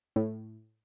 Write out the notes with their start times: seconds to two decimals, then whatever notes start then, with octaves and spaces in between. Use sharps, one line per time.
0.16 A2